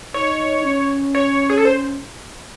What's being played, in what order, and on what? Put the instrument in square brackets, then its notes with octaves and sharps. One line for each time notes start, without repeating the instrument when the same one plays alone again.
[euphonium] D#4 [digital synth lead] C#5
[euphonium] C#4
[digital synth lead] C#5
G#4
A4
C5